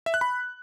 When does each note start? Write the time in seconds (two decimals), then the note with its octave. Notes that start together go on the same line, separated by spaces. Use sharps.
0.06 E5
0.14 F#6
0.21 B5